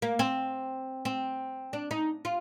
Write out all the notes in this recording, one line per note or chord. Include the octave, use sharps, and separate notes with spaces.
A#3
C4
C4
D4
D#4
F4